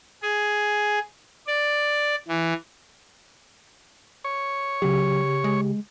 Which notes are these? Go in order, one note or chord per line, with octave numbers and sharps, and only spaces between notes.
G#4
D5
E3
C#5
C#3 F#3 G4
G#3